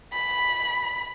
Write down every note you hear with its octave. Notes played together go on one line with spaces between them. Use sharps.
B5